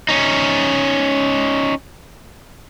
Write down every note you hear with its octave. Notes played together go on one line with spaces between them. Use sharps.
C#4 D#4